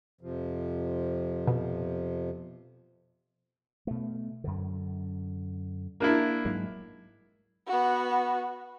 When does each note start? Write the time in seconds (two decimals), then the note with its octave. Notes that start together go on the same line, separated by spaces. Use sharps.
0.21 F2 C3 F3
1.47 B2
3.87 B2 A3
4.44 F#2 D3
6.00 A#3 D4 E4
6.45 G#2 F#3 G#3
7.67 B3 F#4